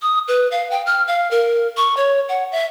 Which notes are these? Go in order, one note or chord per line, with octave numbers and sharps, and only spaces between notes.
D#6
B4
F5
G5
F6
F5
A#4
C#6
C#5
F#5
E5